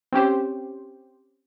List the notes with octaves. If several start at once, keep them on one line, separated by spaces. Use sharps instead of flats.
C4 C#4 G4 C5